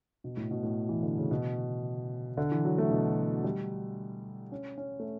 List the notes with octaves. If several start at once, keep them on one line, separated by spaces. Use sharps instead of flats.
B2
A2
B2
A2
E3
D3
C#3
B2
D3
E3
F#3
A3
B2
G3
C#4
C#4
A3